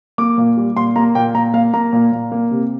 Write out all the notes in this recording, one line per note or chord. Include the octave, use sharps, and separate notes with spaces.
A#3 D6
A#2
G3
A#2 C6
A#3 A#5
A#2 G5
A#2 A#5
A#3 F5
A#3 A#5
A#2
A#2
A#3
C3